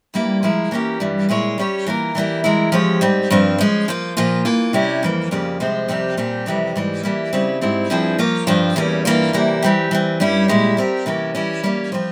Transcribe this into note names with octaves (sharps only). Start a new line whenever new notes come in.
G2 G3 A#3 E4
F3 G#3 E4 A#4
E3 A#3 C#4 G4 A#4
G2 E3 G3
A#2 G#3 E4 G#4 C#5
G3 C#4 G4 C#5
E3 A#3 F4 A#4
E3 G3 A#3 E4
E3 G#3 E4 A#4
F3 G#3 C4 G4 C#5
G#2 G3 C4
G2 F3 C4 F4
F3 G#3 C#4
F3 A#3 F4
A#2 F3 A#3 F4
E3 A#3 F4
C3 G3 C#4 E4
F2 E3 A#3
F2 C#3 G3 A#3 F4
C3 F3 G#3 C4
F2 C3 G3 C4 G4
A#2 G3 C4 G4
F2 C3 E3 G3
G#2 E3 G3
E3 G3 A#3 E4
C#3 G3 C4 E4
G#2 G3 C4 E4
G2 F3 C4 E4 G#4
F3 A#3 F4 A#4 C#5
G2 F3 C4 F4
E2 E3 G3 A#3 C#4
G2 E3 A#3 F4 A#4
C3 E3 G3 A#3 E4
E3 G3 C4 G4
E3 G3 C4
G2 G3 C#4 E4
A#2 G#3 E4 G4
G3 C4 G4 A#4
C3 E3 A#3 C#4
E3 G3 C#4 E4
G3 A#3 C#4
F3 C4 F4